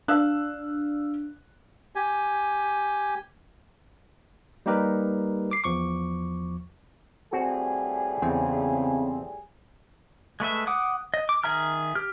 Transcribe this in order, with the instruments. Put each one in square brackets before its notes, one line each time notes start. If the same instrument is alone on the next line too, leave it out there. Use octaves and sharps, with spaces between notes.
[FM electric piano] D4 [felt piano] F5 E6 F#6
[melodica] G4 G#5
[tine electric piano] G3 A#3 D#4 G4 A#4 B4
D6 C7
E2 F3 C#6 D6
[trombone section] A2 G3 G#4 [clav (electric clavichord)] C4 F#4
[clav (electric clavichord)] E2 [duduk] C#3 [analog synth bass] C4
[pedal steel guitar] G#3 A3 B4 E5
F#5 D6 D#6
D#5
D6
D#3 G#4 E5 A#5 F6
G4 F6